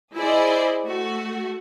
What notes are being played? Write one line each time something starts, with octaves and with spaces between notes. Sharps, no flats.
E4 G#4 C5 D5 D#5
A3 F#4